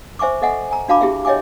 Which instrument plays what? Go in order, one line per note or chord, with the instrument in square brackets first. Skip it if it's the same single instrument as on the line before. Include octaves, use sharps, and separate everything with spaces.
[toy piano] C5 E5 G#5 C#6 D6
A4 D#5 E5 F#5 G#5
G#5 A#5
D4 F#4 F5 A5 B5 D6
E4 G4 G#4 E5
C#5 D#5 E5 G5 G#5 D6